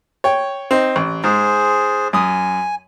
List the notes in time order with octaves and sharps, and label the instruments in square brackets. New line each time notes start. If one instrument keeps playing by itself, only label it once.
[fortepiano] C#5 G5
C4 D#4
A1
[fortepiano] G#2 [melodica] G#4 C5
[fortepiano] F#2 D#6 [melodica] G#5